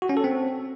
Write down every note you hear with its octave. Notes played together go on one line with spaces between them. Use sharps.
F#4
C#4
A4
C4